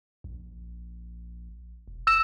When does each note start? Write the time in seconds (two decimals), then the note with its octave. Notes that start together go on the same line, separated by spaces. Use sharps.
0.24 A#1
1.88 E1
2.07 F1 E6 E7